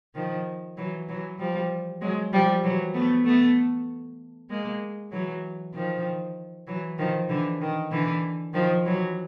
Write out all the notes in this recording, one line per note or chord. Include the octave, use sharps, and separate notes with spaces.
D#3 F3
E3 F#3
E3 F#3
F3 G3
F#3 G#3
F3 G3
E3 F#3
A3 B3
A3 B3
G#3 A#3
E3 F#3
D#3 F3
E3 F#3
D#3 F3
D3 E3
D#3
D3 E3
D#3 F3
E3 F#3